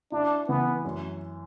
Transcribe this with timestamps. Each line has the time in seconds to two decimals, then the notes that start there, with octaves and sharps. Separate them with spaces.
0.12 D4 E4
0.48 E3 B3
0.85 F#2